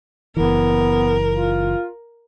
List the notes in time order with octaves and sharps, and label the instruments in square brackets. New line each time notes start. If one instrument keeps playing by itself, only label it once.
[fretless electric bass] F#1 E3 [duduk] B3 [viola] A#4
[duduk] F4